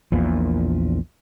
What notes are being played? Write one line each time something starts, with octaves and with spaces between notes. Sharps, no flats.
A#1 E2 A#2